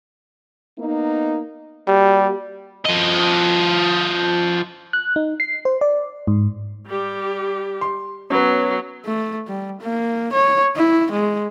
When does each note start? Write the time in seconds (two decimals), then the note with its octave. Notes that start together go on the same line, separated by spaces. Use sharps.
0.78 A#3 B3 D#4
1.88 G3 A#3 F#4 G4
2.86 F3 D#5
4.93 F#6
5.16 D#4
5.40 C7
5.65 C5
5.81 D5
6.27 G#2
6.87 G3 G4
7.81 C6
8.30 F#3 B3 C#4 B4
9.05 A3
9.48 G3
9.81 A#3
10.33 C#5
10.76 E4
11.12 G#3